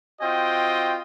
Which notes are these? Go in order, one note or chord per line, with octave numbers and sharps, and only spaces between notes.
C4 F4 F#4 D#5 G5